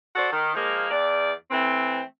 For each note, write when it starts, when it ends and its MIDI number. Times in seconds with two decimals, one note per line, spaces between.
0.16 0.29 66
0.16 0.29 69
0.16 0.29 72
0.16 0.29 74
0.32 0.52 51
0.55 0.86 53
0.55 0.86 56
0.55 0.86 58
0.90 1.31 40
0.90 1.31 74
1.51 2.00 52
1.51 2.00 57
1.51 2.00 60